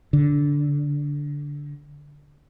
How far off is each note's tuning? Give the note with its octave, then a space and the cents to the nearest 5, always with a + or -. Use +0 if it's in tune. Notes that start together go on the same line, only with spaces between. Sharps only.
D3 -15